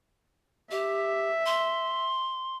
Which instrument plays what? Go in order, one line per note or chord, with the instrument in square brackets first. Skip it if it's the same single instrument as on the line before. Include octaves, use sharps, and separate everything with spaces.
[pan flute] G4 [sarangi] E5
[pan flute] C6